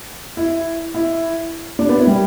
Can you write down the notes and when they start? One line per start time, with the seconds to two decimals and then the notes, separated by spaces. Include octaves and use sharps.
0.37 E4
0.94 E4
1.79 D4
1.89 B3
1.98 E4
2.07 G3